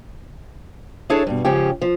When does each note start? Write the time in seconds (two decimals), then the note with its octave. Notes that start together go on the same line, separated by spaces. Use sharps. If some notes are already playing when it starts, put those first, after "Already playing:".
1.10 D4 E4 G#4 A4 C#5
1.27 G2 B2
1.45 G#2 C#3 F3 C#4 G4
1.82 F3